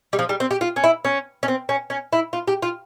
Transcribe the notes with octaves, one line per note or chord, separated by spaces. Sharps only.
G3
F3
G3
C4
G4
F4
C#4
E4
C#4
C#4
C4
C#4
C#4
E4
F4
G4
F4